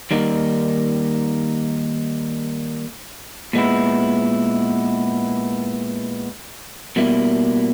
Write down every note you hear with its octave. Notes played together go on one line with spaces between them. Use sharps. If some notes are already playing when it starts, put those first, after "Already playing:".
D#3 G3 A#3 D#4
A#2 G#3 B3 E4
B2 G3 A#3 E4